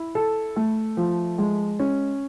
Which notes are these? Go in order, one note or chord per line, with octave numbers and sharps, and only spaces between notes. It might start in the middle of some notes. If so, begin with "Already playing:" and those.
Already playing: E4
A4
A3
F3
G#3
C#4